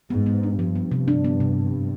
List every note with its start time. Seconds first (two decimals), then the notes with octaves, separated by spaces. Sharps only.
0.10 G#2 B3
0.26 B3
0.43 D4
0.59 G2 F3
0.75 B3
0.91 C3
1.08 D4
1.25 B3
1.40 C3